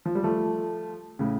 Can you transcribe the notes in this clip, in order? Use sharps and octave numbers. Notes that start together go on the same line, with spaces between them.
F3
G3
F3 A3
A2 C#3